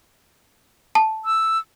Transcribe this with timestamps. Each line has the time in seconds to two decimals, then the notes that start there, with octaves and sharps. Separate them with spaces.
0.95 A5
1.25 E6